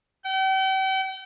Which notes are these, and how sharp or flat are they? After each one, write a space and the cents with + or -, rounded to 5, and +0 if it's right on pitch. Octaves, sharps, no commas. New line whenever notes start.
G5 -40